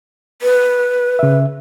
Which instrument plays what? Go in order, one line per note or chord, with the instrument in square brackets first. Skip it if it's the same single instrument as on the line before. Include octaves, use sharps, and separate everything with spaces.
[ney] B4
[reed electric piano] C#3 E5